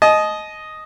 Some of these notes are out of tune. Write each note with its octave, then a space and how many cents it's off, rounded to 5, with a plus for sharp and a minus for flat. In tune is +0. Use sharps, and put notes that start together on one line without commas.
D#5 +0 A5 -40